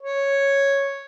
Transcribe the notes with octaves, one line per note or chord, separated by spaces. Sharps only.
C#5